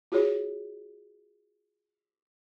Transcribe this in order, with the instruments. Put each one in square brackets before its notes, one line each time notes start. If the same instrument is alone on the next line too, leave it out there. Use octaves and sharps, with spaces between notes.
[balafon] F4 F#4 G#4 C#5